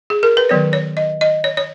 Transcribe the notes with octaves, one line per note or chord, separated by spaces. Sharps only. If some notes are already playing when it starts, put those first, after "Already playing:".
G#4
A#4
B4
D#3 F#3 B3 C#5
C#5
D#5
D#5
C#5
C#5